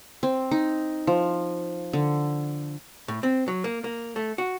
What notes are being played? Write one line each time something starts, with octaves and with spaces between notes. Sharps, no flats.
C4
D#4
F3
D3
A2
C4
F#3
A#3
A#3
A3
F#4